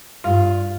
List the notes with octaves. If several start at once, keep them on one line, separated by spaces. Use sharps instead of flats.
G2 F4